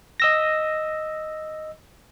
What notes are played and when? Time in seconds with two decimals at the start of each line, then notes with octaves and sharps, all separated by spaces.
0.20 D#5 E6 A#6